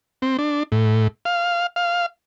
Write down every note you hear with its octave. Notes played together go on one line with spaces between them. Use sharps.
C4
D4
A2
F5
F5